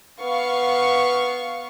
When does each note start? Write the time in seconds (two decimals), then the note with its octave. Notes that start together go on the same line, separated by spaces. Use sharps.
0.20 B3 F5 C#6